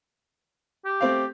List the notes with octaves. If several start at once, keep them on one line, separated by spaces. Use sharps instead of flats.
G4
A3 C4 F5